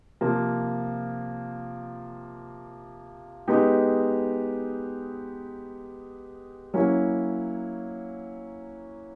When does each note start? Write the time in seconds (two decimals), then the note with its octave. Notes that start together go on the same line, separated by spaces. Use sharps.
0.21 C3 F3 A#3
3.48 G#3 B3 D#4 G4
6.74 F#3 A#3 C#4 E4